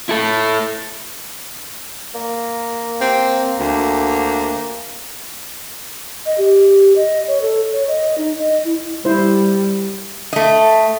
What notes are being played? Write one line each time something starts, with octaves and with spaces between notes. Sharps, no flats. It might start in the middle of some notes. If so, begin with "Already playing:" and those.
E4 A4
A#3
C4
D2
D#5
G4
D#5
C#5
A4
C#5
D#5
D#4
D#5
E4
G3 E4 C5
A3 D#5